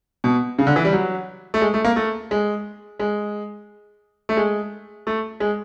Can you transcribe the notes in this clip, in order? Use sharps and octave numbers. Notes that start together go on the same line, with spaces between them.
B2
C#3
D3
E3
G3
F#3
A3
G#3
A3
A#3
A3
G#3
G#3
A3
G#3
A3
G#3